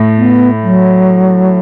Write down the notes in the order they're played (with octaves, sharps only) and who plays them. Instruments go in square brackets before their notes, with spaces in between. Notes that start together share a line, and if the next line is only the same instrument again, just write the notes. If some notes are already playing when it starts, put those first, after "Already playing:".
Already playing: [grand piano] A2
[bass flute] B3
F#3